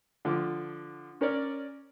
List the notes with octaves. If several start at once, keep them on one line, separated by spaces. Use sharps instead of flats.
D3 F3 D6
C#4 A#4 C#5 D5